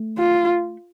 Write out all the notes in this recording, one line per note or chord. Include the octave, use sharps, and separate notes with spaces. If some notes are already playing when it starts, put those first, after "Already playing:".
Already playing: A3
F4